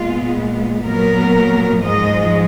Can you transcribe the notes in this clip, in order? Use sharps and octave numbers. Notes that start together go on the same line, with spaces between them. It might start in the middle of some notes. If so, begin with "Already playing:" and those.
Already playing: A#2 G#3 B3 F4
A#2 F#3 B3 A#4
G#2 F3 G#3 D#5